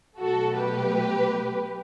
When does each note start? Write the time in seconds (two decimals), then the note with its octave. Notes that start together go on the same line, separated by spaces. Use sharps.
0.19 B2 F#3 A3 F#4 A4
0.58 G4 B4